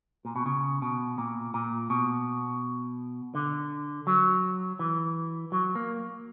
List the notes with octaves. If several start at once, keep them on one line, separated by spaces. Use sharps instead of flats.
A#2
B2
C#3
B2
A#2
A#2
B2
D3
F#3
E3
F#3
A#3